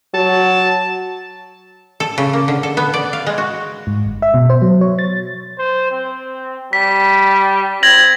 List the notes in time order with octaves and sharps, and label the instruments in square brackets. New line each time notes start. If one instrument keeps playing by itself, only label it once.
[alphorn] F#3 [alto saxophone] A5
[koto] A4
C#3
A#3
D3
A4
B3
D5
F5
G#3
F#4
[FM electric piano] G#2
G1
E5
B2
C5
F#3
C#5
A6
[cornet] C5
C4
[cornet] G3 [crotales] B6
[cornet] C4 [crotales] G#6 A#6 F#7